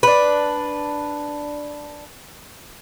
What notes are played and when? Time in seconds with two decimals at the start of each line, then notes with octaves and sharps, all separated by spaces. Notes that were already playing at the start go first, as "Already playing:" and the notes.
0.03 D4 B4